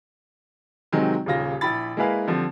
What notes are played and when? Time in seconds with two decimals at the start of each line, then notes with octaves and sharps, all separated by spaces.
0.92 C3 D#3 F#3 G#3 C4
1.26 D#1 D#2 C#3 F4 A#6
1.61 A#1 E4 B5 A6
1.97 G#3 A#3 E4 G#4 B4 F5
2.27 D3 F3 G3 C4